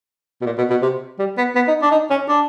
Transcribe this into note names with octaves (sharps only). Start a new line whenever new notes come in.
B2
A#2
B2
B2
C3
G3
B3
B3
D#4
D4
D#4
C#4
D4